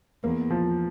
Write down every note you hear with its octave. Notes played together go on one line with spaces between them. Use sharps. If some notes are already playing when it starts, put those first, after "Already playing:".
E2 A#3
F3